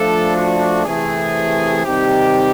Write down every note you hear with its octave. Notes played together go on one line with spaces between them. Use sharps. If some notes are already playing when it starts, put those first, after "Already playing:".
Already playing: F3 A3 D4 A4
F#4
C3 E3 A3 G#4
C3 D#3 G3 C4 D#4 G4